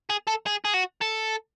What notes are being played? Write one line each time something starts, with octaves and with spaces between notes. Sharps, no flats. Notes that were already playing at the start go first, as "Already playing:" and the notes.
G#4
A4
G#4
G#4
F#4
A4